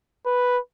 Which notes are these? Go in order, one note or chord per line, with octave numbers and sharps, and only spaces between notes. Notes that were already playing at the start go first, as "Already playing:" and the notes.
B4